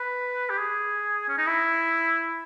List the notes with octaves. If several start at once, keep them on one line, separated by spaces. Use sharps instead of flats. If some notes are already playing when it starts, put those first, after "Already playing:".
Already playing: B4
G4
G#4
C#4
D#4
E4